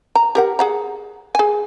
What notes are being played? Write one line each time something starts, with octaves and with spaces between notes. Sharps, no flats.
A#5
G4 A#4 F#5
G#4 F#5 A#5
G#4 G#5